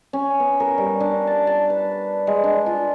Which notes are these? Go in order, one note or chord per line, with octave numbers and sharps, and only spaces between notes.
C#4
B3
A#4
G3
D4
A5
A5
B4
G#3
D4
F4